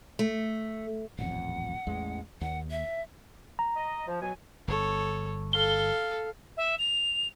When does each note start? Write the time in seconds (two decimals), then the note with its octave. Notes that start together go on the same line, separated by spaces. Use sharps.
0.19 A3
1.19 D#1 A1 F2 F#5
1.87 A1 E2 G#3
2.41 D#2 F#5
2.71 E5
3.59 A#5
3.75 D#5
4.07 F3
4.21 B2 F#3 G#5
4.68 G1 A4 C#5
5.53 A4 F5 G7
6.57 E5
6.78 F7